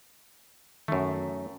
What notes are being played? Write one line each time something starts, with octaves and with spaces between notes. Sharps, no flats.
F#2 D#3 A3